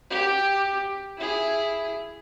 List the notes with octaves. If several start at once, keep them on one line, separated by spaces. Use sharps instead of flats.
G4
E4 G#4